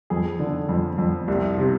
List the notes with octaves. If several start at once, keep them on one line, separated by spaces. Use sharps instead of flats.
F2 G#4
D3
F2
F2
C2
C3